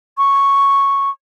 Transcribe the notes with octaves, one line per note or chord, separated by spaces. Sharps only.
C#6